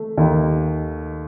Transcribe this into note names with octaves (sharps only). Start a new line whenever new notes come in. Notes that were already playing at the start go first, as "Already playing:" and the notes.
Already playing: A3
D#2